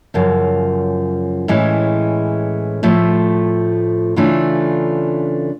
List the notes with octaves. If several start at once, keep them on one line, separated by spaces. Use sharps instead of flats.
F#2 C#3 F3
A2 E3 G#3 C#4
A2 F3 A3
C#3 E3 A3 D4 F4